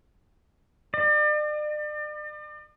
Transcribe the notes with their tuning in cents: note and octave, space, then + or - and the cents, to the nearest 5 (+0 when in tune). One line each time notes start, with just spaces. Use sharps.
D5 +40